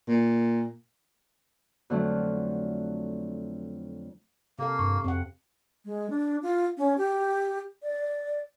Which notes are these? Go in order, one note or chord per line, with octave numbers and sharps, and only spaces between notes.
A#2
F2 D3 F3 F#3 A3
C3 A#3 A4 F5
G2 C#6
F2 C4 F#5
G#3
D4
F4
C#4
G4
D5